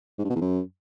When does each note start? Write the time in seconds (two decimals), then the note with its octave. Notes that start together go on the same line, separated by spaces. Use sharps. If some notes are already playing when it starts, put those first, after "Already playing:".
0.19 G#2
0.24 G2
0.30 B2
0.36 E2
0.41 F#2